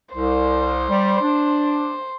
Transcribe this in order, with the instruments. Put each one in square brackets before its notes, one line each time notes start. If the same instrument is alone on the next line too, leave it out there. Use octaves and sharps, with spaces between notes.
[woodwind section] C2 [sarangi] C5
[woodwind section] G3
D4